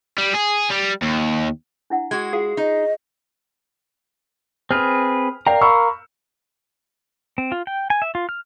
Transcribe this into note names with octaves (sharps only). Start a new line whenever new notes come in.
G3
G#4
G3
D#2
D4 E4 F#5
G#3 F#4 G#6
F4 G#4 F5
D#4 D#5
C4 G#4 B4 F6
A#4 D5 F5 G5 A#5
B5 C#6 E6
C4
F4
G5
G#5
E5
F4
F6